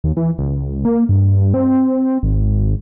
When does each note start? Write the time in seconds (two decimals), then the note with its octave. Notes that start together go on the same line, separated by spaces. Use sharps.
0.04 D#2
0.17 E3
0.39 C#2
0.85 A#3
1.09 G2
1.54 C4
2.23 G#1